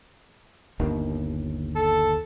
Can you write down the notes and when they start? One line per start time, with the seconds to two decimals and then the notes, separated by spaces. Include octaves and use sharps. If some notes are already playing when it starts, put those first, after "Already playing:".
0.80 G1 D#2 D#3
1.76 A4